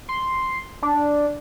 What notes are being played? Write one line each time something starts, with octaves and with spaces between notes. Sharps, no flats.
C6
D4